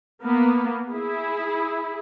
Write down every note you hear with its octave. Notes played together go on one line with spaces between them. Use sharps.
A#3 B3
E4 G#4